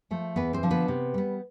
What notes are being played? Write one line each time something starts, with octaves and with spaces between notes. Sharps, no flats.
F3 A3
E2 B3 B4
C4 C5
D3 F3
B3 B4
C3
G3 B3